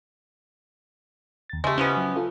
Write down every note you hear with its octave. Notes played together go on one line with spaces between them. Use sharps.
D#2 A6
C#3 G#3 A3 G4
E3 F3 B3 C#4
F#3
F4 A4